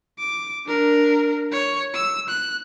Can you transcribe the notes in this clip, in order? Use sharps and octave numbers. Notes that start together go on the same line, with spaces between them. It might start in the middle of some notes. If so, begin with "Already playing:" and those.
D6
D4 A#4
C#5
E6
F#6